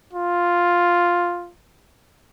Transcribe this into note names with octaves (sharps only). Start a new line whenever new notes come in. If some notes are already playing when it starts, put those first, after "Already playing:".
F4